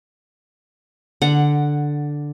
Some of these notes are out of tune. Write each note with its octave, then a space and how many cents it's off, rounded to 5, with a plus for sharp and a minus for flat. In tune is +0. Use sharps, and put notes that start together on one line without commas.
D3 +0 F#5 +0